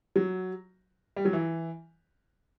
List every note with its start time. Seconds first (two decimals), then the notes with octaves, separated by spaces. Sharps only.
0.16 F#3
1.16 G3
1.25 F#3
1.33 E3